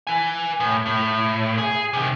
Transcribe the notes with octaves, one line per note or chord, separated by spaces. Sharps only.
B4 G#5
A2
A2
G#4
C3 D#3